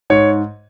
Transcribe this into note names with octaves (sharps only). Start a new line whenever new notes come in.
G#2 C#5